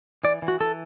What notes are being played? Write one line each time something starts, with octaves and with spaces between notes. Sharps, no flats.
E3 D5
E3
F#4
E3 A4